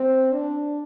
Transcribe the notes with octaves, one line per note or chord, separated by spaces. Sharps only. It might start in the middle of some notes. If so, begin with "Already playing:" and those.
Already playing: C4
D4